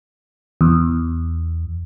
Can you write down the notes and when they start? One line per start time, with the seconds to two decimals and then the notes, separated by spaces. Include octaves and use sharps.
0.61 E2